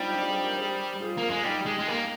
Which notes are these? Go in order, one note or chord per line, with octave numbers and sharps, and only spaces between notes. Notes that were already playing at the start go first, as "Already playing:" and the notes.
Already playing: G3 C4 D4 D#4 F4
D4 F4
G#4 C5
G4 A#4
G#4 C5
F4 G#4
A#3
G#3
G3 D#4 G4
G#3
G#3
A#3